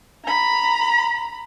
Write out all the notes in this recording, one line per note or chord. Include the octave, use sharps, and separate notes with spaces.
A#5 B5